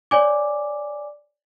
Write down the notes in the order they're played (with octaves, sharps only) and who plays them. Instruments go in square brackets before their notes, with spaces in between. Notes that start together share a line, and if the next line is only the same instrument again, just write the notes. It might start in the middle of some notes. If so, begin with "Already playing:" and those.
[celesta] C#5 D5 G#5 D6